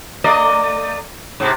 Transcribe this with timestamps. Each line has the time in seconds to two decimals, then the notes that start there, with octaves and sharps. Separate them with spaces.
0.24 A3 D5 D#5
1.40 G#2 C3